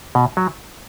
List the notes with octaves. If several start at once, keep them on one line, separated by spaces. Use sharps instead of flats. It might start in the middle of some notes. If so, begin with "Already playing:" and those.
B2
F#3